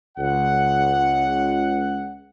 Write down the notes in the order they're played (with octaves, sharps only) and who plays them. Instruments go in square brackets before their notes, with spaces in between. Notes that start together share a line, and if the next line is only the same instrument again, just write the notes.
[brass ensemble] C#2 F#5